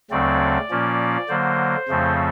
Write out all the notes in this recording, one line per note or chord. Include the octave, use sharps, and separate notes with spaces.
D2 C#3 F#3 A3 C4 D5
A#2 F3 A#3 C#4
D3 F#3 A#3 C5
F2 C#3 F3 A3 C4